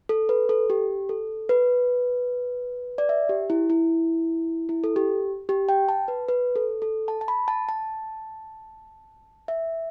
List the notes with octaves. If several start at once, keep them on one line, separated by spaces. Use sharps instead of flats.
A4
B4
A4
G4
A4
B4
D5
E5
G4
E4
E4
E4
A4
G4
G4
G5
A5
B4
B4
A4
A4
A5
A5
B5
A5
A5
E5